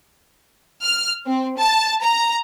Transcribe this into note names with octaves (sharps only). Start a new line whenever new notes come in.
F6
C4
A5
A#5